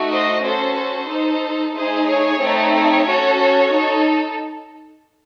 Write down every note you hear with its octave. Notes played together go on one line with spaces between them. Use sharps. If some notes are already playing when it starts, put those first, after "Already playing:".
Already playing: A3 D#4 F#4
C5 D#5
C#4 F#4 A4 C5
C5
D#4 A4
A3 D#4 G#4 C5
C#5
A3 C4 D#4 A4
C#5
C#4 F#4 A4
C#5
D#4 A4